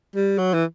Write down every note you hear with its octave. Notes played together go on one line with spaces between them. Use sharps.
G3
F#3
E3